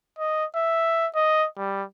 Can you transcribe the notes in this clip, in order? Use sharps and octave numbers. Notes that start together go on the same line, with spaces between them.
D#5
E5
D#5
G3